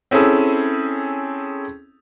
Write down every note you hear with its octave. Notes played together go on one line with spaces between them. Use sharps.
C4 C#4 E4 G#4 A4